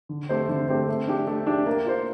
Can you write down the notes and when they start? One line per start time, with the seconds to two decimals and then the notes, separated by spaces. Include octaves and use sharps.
0.09 D3
0.29 A3 C4 G4 C5
0.49 D3
0.68 A3 C4 G4 C5
0.88 A3
1.07 D4 G4
1.27 A3
1.46 D4 G4
1.66 A#3
1.86 F4 C5